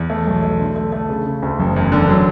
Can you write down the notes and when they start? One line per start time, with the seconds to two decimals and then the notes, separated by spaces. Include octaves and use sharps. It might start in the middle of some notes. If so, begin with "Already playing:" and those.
Already playing: E2
0.10 A3
0.27 B1
0.43 A3
0.60 D3
0.76 A3
0.92 A3
1.09 C#3
1.26 C#3
1.42 D2
1.60 F#1
1.76 E2
1.92 D3
2.09 F#3